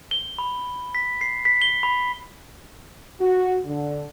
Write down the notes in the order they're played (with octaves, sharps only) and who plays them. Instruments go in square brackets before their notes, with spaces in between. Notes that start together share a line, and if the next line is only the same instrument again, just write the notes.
[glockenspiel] G7
B5
B6
C7
B6
G7
B5
[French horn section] F#4
D3